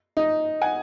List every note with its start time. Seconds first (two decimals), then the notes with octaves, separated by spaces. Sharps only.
0.17 D#4
0.62 F#5 G#5